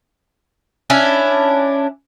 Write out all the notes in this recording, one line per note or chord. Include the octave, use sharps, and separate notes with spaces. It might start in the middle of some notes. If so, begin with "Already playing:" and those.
C#4 D4 E4